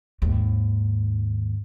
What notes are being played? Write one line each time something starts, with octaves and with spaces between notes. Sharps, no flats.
D#2 G#2